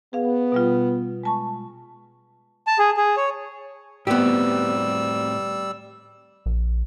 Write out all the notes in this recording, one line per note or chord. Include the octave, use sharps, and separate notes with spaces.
B3 G#4 F5
B2 G3 F4
G#3 A5 C#6
A5
G#4
G#4
C#5
A2 G3 B3 C4 G4 E6
A#1